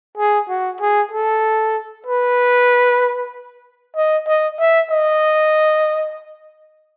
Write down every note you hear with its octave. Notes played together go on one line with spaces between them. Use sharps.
G#4
F#4
G#4
A4
B4
D#5
D#5
E5
D#5